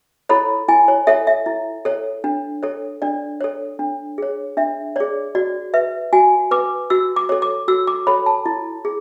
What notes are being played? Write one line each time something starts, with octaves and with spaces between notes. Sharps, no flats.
E4 A4 C#5 B5
E4 G#5
C#5
A4 C#5 E5
E5
E4
A4 C#5
D4
A4 C#5
D4 D5
A4 C#5
D4
G#4 C#5
D4 E5
G#4 C#5 D5
F#4 D5
B4 E5
F#4 G#5
B4 D6
F#4 E6
D6
A4 C#5
D6
F#4 E6
D6
A4 C#5 B5
A5
E4
G#4